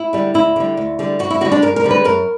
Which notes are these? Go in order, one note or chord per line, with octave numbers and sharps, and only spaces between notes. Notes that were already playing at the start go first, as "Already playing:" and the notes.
Already playing: E4
D3 G3
D2 E4
D3 G3
D2
D3 G3
G2 F#4
E4
D3 G3 F#4
D4
G2 A#4
A#4
D3 G3
B4
F#2 A#4